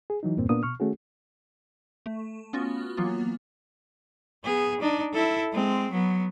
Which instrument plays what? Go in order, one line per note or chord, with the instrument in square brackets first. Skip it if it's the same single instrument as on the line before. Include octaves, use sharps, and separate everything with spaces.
[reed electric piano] G#4
E3 F#3 D#4
E2 G2 A#2 A#3 C4
A#2 A#3 B3 D4 D#6
B2 C#6 F6
D#3 A3 C#4 F#4 G#4
[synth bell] A3
B3 C#4 F4 F#4
E3 F#3 A#3 B3 F4
[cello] B3 G#4
D4 D#4
E4 A4
G#3 C4
F#3 B3